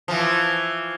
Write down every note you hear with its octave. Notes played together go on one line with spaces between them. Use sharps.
E3 F3